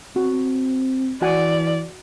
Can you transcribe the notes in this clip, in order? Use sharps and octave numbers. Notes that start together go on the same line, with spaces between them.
C4 F#4
E3 F#4 D5 F#5 G#5